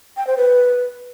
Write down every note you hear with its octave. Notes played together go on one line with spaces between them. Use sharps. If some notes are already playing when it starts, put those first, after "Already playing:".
G5
C5
B4